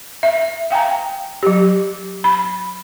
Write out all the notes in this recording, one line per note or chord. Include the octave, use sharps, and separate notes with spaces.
E5
F5 G5 G#5 A#5
F#3 G4
B5